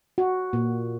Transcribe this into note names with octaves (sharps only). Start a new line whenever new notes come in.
F#4
A#2